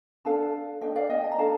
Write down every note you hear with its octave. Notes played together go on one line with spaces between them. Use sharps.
D4 A4 F5 A5
D4 A4 D#5 G5
D5 F5
D#5 G5
A5
A#5
D4 A4 F5 A5